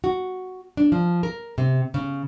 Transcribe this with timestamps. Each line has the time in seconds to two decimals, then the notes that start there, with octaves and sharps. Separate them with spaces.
0.04 F#4
0.77 D4
0.92 F3
1.23 A#4
1.58 C3
1.94 C#3